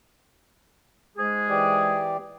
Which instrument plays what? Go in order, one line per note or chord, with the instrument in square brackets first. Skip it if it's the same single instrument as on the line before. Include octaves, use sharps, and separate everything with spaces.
[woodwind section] G#2 G#3 G#4
[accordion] E3 G4 D5